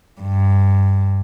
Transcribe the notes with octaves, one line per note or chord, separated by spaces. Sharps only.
G2